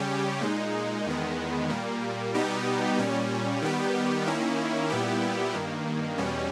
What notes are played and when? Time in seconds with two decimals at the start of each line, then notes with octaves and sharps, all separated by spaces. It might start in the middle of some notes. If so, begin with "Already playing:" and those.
Already playing: C#3 G3 C#4 G4
0.41 A#2 G#3 D#4
1.06 E2 D#3 G#3 B3
1.69 A#2 G3 A#3
2.34 B2 G3 B3 D#4 G4
2.98 A#2 G3 C#4
3.62 D#3 G3 B3 G4
4.26 D#3 A#3 C#4 E4
4.90 A#2 G3 B3 E4 G4
5.54 G2 D#3 A#3
6.18 E2 B2 G3 C#4